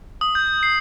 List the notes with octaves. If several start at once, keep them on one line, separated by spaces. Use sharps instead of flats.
D#6
G6
C7